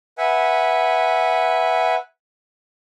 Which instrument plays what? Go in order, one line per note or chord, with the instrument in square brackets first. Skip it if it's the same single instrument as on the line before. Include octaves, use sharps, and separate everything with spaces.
[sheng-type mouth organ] B4 E5 F#5 G#5